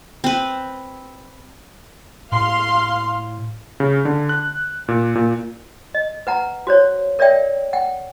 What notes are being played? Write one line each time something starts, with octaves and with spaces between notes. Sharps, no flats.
C4 B4
A2 F5 C6
C#3
D3
F#6
A#2
A#2
D#5
B4 F#5 A#5
F#4 C5 C#5
A#4 C#5 D5 E5 G5
F#5 G5